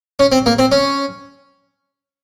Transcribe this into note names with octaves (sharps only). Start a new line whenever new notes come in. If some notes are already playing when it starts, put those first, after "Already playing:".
C#4
C4
A#3
C4
C#4